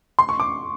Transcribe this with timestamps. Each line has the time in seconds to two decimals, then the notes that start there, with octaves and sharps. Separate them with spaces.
0.19 C6
0.29 C#6
0.40 D6